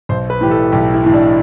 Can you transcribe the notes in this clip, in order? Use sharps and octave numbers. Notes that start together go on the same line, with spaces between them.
B1 C5
B4
A2 E3 G4
A4
B1 G4
E4
A2 E3
D4